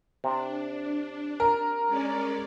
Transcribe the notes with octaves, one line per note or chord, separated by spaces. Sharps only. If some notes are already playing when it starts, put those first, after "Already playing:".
C3 D4
A#4
G#3 C#4 D5